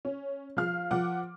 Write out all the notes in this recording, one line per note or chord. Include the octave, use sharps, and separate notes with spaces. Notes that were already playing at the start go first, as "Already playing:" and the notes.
C#4
F3 F5 F6
F3 F#5 D6